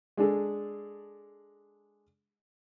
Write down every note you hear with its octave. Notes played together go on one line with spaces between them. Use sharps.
G#3 D4 G#4 A4